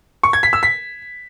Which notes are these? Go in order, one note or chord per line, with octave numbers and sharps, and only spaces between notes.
C#6
G#6
B6
E6
B6